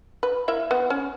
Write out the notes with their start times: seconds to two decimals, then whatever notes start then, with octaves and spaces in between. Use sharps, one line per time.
0.23 B4
0.48 A#3 E4 E5
0.71 B3
0.90 C#4